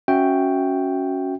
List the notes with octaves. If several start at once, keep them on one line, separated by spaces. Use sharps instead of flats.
C#4 F#4 E5 G5